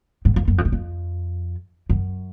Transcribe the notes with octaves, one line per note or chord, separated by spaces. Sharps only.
G#2
F2
F#2
F2
F#2
F2
F#2